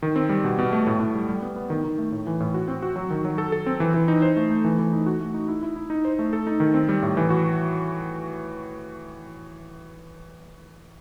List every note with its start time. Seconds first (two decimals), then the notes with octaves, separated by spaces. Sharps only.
0.03 D#3
0.16 C4
0.29 G3
0.44 B2
0.59 B2
0.73 A3
0.87 A2
1.00 A2
1.15 G3
1.29 G3
1.42 B3
1.56 B3
1.70 D#3
1.84 D#3
1.98 A3
2.12 A2
2.27 E3
2.40 A2
2.54 F#4
2.68 C4
2.82 F#4
2.96 F#3
3.10 D#3
3.25 F#3
3.38 A4
3.52 A4
3.66 C4
3.80 E3
3.94 E3
4.08 D#4
4.22 C5
4.36 A3
4.51 A3
4.64 E3
4.79 E3
4.93 D#4
5.06 F#4
5.20 A3
5.34 D#4
5.48 E4
5.63 E4
5.76 E4
5.90 D#4
6.05 C5
6.19 A3
6.33 A4
6.47 D#4
6.60 D#3
6.74 C4
6.89 G3
7.02 A2
7.17 E3
7.30 F#4